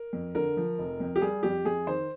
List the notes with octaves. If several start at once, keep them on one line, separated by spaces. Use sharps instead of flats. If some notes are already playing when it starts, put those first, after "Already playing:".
Already playing: A#4
F2
D3 A#4
F3
F1
F2
G4
G3 G#4
F2 G4
F2 G#4
D#3 C5